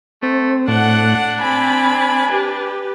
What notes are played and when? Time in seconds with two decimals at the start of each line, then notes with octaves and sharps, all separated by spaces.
0.23 A3 C4
0.68 A2 D4 F#5
1.41 C4 G#5 B5
2.30 G4 B4